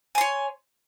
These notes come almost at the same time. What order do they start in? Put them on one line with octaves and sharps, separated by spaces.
G#5 C6 C#5